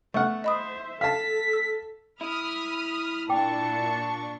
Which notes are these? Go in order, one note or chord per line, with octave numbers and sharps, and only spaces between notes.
A3 B3 F#5 C#6 F6
C5 D#5 E5 B5 D#6
A4 F5 A5 B6
E6
E4 B5 D#6 F6
A#2 D4 G5 A5 C#6 D6